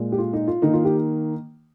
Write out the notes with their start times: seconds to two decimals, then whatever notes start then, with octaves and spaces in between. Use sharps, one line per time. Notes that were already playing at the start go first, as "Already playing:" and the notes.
Already playing: A#2 G#3
0.12 G4
0.18 F4
0.33 D#4
0.48 F4
0.62 D#3 A#3 D#4
0.73 F4
0.85 G4